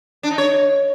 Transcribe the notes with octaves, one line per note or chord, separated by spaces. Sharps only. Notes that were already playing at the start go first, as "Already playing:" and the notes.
D4
D#4
C#5